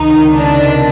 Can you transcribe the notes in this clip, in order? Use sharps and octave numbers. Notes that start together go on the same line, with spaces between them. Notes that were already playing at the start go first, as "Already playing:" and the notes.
Already playing: C#2 C3 D#3 D#4
D4